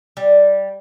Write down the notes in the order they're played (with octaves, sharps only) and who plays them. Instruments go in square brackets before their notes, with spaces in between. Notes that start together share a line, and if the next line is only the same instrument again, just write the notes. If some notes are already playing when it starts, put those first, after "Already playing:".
[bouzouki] G3